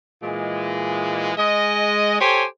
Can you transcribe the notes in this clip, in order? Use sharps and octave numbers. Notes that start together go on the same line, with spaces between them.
A#2 E3 G#3
G#3 D#5
G4 A4 C5 C#5 G#5